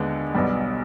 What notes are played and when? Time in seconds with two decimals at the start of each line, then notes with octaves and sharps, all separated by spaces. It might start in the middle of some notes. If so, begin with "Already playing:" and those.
Already playing: D#2 D3 G#3 B3
0.35 B1 B2 G3